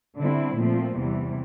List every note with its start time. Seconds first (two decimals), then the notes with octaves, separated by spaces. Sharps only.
0.18 D3 G3 C4 E4
0.57 A#2 F3 A3 C4
0.96 E2 C3 E3 G3